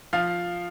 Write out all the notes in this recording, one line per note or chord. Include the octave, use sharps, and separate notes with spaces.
F3 F5